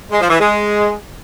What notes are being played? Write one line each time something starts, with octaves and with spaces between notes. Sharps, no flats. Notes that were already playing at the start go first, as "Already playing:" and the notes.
G#3
F3
E3
G#3